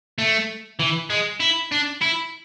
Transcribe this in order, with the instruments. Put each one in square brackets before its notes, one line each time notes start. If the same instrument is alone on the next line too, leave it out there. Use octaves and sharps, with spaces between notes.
[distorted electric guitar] A3
E3
G#3
E4
D4
E4